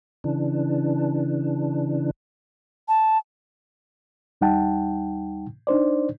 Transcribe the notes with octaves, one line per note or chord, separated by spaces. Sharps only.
C#3 E3 D4
A5
D#2 G3 D#4 F#5 G5 A5
D4 D#4 C5 D5